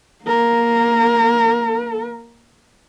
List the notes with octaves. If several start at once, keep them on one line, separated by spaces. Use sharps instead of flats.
A#3 A#4